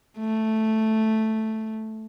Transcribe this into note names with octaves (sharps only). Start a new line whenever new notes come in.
A3